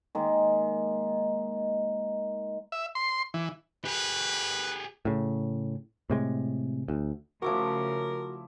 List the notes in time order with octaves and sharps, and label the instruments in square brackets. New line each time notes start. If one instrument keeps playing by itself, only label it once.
[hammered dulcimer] D#3 G#3 A#3
[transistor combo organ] E5
C6
E3
[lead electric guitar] G4 G#4 [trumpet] B4
[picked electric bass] A2 C#3
A2 C3 G#3
D2
[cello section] C#3 A3 [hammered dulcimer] F3 E4 D6 [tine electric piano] F#4 [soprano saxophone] A#4